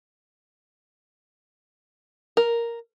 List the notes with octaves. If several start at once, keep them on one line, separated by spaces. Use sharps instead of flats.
A#4